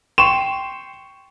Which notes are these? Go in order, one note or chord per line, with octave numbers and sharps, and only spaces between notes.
G5 C6 C#6 E7